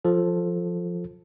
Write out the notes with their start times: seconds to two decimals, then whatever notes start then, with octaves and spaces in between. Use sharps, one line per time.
0.05 F3 A4